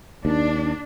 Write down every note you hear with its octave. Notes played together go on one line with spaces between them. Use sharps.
D#2 D4